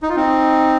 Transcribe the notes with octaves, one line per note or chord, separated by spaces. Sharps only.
D#4
F4
C4 D#4